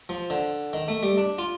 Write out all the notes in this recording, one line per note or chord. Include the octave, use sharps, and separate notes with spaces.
F3
D3
D#3
A3
G3
D4
F4